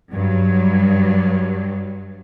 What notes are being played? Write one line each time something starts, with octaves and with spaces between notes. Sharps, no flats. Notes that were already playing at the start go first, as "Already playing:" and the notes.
G2 F#3 G3